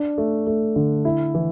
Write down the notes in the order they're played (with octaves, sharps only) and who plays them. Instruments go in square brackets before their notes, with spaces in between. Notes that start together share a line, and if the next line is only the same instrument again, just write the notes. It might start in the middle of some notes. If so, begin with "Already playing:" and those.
Already playing: [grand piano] D4
A3
A3
D3
E4
E3